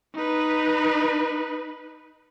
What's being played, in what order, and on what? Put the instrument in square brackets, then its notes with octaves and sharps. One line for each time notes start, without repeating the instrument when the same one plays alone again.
[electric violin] D#4 B4